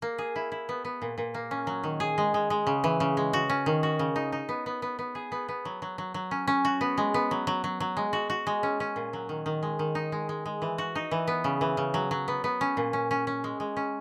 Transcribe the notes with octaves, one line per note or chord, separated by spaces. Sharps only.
A#3
G#4
E4
E4
B3
B3
A#2
A#2
A#3
C#4
F#3
D#3
G#4
G#3
G#3
G#3
C#3
E3
C#3
G#3
F#4
C#4
D#3
F#4
C#3
D#4
D#4
B3
B3
B3
B3
G#4
B3
B3
F#3
F#3
F#3
F#3
C#4
C#4
F#4
B3
G#3
B3
F#3
F#3
F#3
F#3
G#3
F#4
F#4
G#3
C#4
C#4
A#2
F#3
D#3
D#3
G#3
D#3
D#4
G#3
G#3
G#3
E3
F#4
D#4
E3
B3
C#3
E3
C#3
F#3
F#3
B3
B3
C#4
A#2
C#4
C#4
C#4
G#3
G#3
C#4